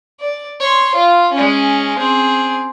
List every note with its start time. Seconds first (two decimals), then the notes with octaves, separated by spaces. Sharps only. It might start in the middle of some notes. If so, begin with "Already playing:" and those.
0.20 D5
0.60 C#5 C6
0.94 F4
1.32 G#3 C#4
1.98 C4 G#4